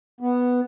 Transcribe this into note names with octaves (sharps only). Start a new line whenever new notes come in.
B3